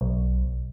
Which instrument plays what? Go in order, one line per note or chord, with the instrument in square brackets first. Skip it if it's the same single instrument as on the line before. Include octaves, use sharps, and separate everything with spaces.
[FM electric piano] B1